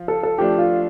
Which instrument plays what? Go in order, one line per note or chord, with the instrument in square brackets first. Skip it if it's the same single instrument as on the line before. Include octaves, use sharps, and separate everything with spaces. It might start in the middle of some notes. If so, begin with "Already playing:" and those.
Already playing: [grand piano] F3 F4
[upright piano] A4
A4
[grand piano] F3 A3 D4 [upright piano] G4
[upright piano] F4